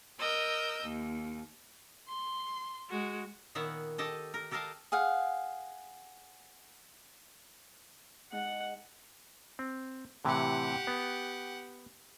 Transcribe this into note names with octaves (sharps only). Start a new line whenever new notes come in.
A#4 D#5 E6 G6
D#2
C6
G#3 F#4
A#2 D#3 B3 C#5 E5 F#5
G4 A4 D#5 A5
A#4
G4 A4 A#4 D#5 F5 A5
G#4 F5 F#5
G#3 D#4 F#5
C4
A2 C3 E3 G4 F#5
B3